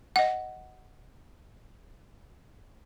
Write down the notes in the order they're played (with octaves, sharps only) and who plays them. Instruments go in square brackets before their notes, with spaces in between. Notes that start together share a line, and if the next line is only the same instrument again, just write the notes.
[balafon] D#5 F#5